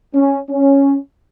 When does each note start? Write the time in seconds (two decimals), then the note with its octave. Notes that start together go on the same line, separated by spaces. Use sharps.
0.14 C#4
0.48 C#4